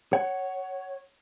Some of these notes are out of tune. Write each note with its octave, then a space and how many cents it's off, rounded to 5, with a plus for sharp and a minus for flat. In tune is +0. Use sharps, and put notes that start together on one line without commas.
C#5 +0 F#5 +20